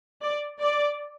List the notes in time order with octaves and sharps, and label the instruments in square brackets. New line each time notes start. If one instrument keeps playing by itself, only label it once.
[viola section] D5
D5